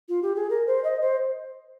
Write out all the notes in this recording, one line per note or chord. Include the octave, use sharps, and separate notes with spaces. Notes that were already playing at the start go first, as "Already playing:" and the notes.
F4
G4
G#4
A#4
C5
D#5
C5